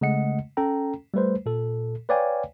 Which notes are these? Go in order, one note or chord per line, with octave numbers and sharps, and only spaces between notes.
C#3 G#3 A3 D#5 F#5 C#7
C#4 A4 G5 A#5
G3 A3 B4 C5
A#2 A4
B4 C#5 D5 F5 G5 G#5